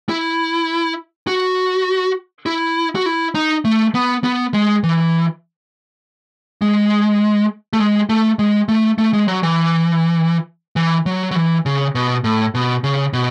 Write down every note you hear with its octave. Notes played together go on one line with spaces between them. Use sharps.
E4
F#4
E4
F#4
E4
D#4
A3
B3
B3
G#3
E3
G#3
A3
G#3
A3
G#3
A3
A3
G#3
F#3
E3
E3
F#3
F#3
E3
C#3
B2
A2
B2
C#3
B2